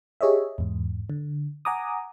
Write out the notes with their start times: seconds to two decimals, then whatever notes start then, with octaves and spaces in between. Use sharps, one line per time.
0.21 G4 G#4 C#5 D#5 E5
0.58 E2 G#2
1.10 D3
1.65 F#5 G#5 A#5 D6 D#6